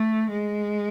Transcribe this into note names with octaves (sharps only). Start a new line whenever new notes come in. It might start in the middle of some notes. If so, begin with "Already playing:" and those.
Already playing: A3
G#3